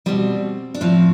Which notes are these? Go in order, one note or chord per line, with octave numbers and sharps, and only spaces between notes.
B2 G3 C4
D4
A2 F3 C4